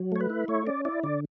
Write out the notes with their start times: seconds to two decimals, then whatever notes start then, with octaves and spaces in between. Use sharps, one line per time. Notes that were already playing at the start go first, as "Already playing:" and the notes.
Already playing: F#3
0.12 A3 C#5
0.21 B4
0.30 E4
0.48 A3 C#5
0.67 C#4 D5
0.85 E4 D5
1.03 D3 D5